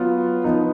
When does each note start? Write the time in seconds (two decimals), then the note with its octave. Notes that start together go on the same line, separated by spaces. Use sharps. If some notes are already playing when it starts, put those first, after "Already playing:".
Already playing: F#3 B3 F4
0.44 F3 B3 D#4